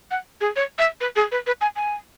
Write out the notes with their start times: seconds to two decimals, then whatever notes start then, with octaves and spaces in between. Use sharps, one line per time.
0.11 F#5
0.41 G#4
0.56 C#5
0.79 E5
1.01 B4
1.16 G#4
1.32 B4
1.47 B4
1.61 G#5
1.76 G#5